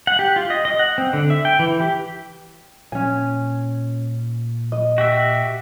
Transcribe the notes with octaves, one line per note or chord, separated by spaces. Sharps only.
F#5
G4
F4
D#5
D#5
F#5
C4
D3
E5
G5
E3
G4
A#2 C#4 G#5
D#5
F#4 G4 E5